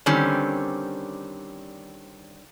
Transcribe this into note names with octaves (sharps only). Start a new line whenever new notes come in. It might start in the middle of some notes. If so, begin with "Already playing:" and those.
D3 D#3 G3 C4 C#4